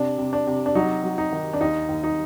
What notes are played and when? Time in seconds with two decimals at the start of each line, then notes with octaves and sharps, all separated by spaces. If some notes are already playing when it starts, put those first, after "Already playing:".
Already playing: C3 D4
0.18 C3
0.33 D4
0.47 C3
0.66 D4
0.75 F#3 D#4
1.03 F#3
1.18 D#4
1.32 D#3
1.53 D4
1.61 D#2 D#4
1.89 D#2
2.03 D#4